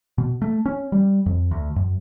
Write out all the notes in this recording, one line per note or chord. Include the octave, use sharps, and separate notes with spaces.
B2
A3
C#4
G3
F2
D2
F#2